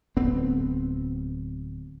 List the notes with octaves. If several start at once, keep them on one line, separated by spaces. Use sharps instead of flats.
D1 B3 C4